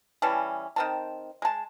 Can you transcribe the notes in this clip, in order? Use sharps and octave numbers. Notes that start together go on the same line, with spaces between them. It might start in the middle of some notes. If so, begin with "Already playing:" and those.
E3 G3 C#4 A5
D#3 C4 A5
G#3 A5